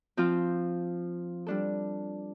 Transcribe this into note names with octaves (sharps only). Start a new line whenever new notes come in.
F3 C4 F4
G3 D4 A4